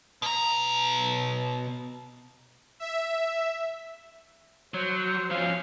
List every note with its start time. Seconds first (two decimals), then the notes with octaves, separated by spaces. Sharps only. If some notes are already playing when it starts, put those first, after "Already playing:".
0.22 B2 A#5
2.80 E5
4.74 F#3 C5
5.31 F3 C#4 F5